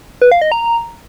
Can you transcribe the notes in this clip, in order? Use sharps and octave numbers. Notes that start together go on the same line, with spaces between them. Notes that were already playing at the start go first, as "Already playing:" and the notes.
B4
F5
D#5
A#5